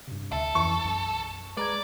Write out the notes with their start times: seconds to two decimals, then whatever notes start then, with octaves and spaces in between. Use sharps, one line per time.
0.08 G2 C3
0.32 D2 A4 E5
0.55 F2 E3 C#6
0.85 B1 F#2
1.57 G#3 B4 D5 A#5 G#6